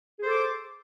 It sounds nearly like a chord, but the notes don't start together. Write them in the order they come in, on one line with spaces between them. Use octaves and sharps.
G#4 C5 A4 D6